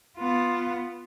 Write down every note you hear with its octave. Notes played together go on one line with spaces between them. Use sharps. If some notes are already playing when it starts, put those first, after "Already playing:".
B3 F4